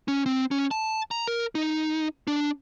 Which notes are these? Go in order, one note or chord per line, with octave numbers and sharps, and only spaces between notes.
C#4
C4
C#4
A5
A#5
A#4
D#4
D4